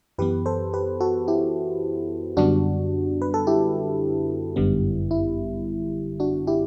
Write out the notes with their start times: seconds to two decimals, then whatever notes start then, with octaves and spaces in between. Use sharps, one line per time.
0.18 F#2 E3 B3 G4 B4
0.46 A4 C5
0.73 G4 B4
1.01 F#4 A4
1.28 E4 G4
2.37 F#2 D3 G3 B3 D4 F#4
3.22 B4
3.34 A4
3.47 E4 G4
4.56 G1 F#2 D3 G3 B3
5.11 E4
6.20 D4 F#4
6.47 E4 G4